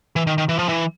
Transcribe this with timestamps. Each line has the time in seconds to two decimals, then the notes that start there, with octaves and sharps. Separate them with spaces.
0.16 E3
0.27 D#3
0.38 D#3
0.49 E3
0.58 F3
0.69 E3